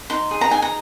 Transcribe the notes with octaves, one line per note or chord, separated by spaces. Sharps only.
D#4 C6
G#4
A#5
D#4 G#5
A#5